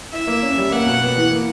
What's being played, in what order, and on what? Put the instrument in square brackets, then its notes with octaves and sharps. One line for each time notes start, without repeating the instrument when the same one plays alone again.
[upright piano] E4 [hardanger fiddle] E5
[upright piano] A#3
C#4
G3
[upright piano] A#3 [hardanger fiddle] F#5
[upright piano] B2
B3
E3
A#3